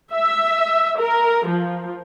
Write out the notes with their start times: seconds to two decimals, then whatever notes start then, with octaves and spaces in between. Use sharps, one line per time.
0.12 E5
0.99 A#4
1.48 F3